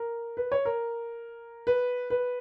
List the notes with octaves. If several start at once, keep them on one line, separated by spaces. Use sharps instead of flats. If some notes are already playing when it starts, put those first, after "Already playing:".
Already playing: A#4
B4
C#5
A#4
B4
B4